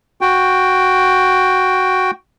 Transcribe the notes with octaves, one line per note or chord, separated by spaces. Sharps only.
F#4 G5